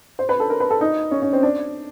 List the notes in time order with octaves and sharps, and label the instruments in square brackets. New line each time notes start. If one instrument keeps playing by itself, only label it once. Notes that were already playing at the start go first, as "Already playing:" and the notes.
[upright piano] C5
B4
A4
A#4
B4
A4
D#4
C#4
C#4
C4
D4